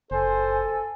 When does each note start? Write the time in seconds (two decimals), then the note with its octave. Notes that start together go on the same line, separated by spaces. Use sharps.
0.11 F#1 A4 C5 G#5